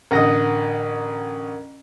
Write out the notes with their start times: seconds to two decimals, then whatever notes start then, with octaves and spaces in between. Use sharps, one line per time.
0.11 A1 D3 A#4 D#5 F#5 A#6